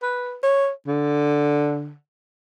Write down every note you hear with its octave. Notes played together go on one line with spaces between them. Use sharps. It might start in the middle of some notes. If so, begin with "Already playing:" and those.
B4
C#5
D3